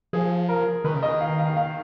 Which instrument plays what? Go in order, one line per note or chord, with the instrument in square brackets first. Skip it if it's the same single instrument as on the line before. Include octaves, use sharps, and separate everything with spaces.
[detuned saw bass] F3 [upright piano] G#4
[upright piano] A#4
[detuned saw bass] D#3 [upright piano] B4
[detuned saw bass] C#3
[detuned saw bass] D#3 [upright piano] D#5
[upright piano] F5
F5
F5